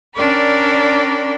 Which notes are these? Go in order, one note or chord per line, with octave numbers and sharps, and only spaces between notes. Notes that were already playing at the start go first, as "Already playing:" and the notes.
C#4 D4 A#4 D5 G5 B5